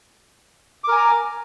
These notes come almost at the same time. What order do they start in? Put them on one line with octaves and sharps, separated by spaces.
D6 A#4 G#5 A#5